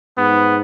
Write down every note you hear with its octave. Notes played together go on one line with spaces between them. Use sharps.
G#2 B3